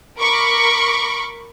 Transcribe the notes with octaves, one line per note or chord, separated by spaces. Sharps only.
A#4 B5 C#6 D6